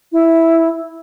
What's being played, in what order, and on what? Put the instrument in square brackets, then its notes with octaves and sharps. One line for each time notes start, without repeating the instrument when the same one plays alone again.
[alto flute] E4